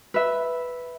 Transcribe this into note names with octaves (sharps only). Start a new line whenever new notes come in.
B4 E5